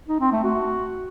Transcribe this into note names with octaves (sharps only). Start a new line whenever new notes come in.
D#4
C4
A3
F#4